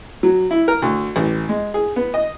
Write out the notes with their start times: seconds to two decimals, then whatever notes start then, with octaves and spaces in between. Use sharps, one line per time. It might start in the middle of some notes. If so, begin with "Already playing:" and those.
0.23 F#3
0.51 E4
0.68 A#4
0.82 D2
1.16 A1
1.49 G#3
1.74 G#4
1.96 B3
2.14 D#5